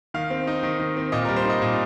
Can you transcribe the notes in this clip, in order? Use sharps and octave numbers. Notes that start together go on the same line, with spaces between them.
D#3 F5
C4
D#4
D#3
D#3
C4
A#2 D#5
A#4
G3
C5
D#4 D#5
A#2